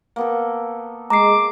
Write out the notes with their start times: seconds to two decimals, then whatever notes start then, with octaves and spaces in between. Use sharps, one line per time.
0.16 A#3 B3 A4
1.10 G#3 A#5 D6 C7